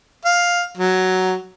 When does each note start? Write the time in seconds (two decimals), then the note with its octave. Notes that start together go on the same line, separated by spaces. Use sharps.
0.25 F5
0.77 F#3